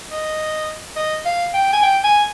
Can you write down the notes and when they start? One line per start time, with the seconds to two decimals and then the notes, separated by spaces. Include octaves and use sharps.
0.11 D#5
0.96 D#5
1.25 F5
1.54 G5
1.73 G#5
1.83 G5
2.04 G#5